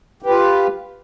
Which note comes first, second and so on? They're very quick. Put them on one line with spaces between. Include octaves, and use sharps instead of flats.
G4 B4 F4